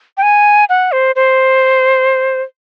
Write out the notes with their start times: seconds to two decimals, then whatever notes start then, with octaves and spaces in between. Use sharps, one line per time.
0.17 G5
0.23 G#5
0.69 F#5
0.92 C5
1.16 C5